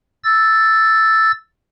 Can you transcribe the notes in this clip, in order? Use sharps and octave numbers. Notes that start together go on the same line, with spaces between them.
E6 A6